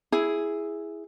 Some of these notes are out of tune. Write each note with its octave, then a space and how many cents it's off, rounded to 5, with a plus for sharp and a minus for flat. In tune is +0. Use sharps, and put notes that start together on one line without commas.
E4 +0 G#4 +0